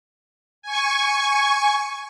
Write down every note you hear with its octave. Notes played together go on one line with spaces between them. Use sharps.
G#5 C#6